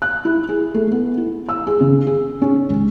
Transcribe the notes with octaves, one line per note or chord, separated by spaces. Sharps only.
F#6
E4
G#4
A3
B3
E4
E6
G#4
C#3
G#4
C#4
C#2